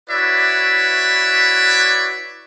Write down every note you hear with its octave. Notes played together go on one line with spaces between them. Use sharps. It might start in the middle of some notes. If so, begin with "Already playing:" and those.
E4 F#4 B4 C#5 D5 E5